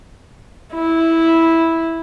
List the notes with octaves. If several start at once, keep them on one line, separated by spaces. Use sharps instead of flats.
E4